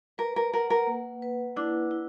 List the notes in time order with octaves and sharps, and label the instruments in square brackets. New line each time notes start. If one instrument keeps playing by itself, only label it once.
[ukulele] A#4 [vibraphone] B4
[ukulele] A#4
[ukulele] A#4 [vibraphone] F#5
[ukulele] A#4
[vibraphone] A#3
B4
[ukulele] D4 [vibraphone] E4
[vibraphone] E4